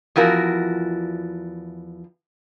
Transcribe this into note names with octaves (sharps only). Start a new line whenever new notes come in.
E2 F3 E4 F#4 A#4